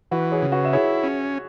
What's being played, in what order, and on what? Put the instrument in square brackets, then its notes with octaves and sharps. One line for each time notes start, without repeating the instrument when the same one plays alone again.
[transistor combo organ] E3 [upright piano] F#4 B4
[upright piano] G#4 C#5
[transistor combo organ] C#3
[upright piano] F#4 B4
E5
[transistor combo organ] E4 [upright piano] G#4 C#5
[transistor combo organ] C#4